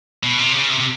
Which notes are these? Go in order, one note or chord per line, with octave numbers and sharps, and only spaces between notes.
B2
C3
C#3
C3
C3